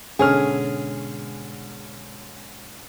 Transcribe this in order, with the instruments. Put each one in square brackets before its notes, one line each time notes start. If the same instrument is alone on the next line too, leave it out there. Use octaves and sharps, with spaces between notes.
[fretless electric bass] G#2 B2 [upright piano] D3 C#4 F6 [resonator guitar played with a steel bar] G#4